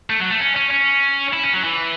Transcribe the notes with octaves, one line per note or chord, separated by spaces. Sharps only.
A3
F#3
A3
C#4
C#4
C#4
E4
C#4
F#3
E3